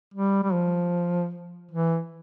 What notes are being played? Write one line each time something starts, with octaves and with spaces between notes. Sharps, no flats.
G3
G3
F3
E3